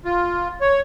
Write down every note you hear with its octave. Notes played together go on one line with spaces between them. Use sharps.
F4
C#5